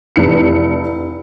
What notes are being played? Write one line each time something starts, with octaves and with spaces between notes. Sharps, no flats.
F1 E3 C#7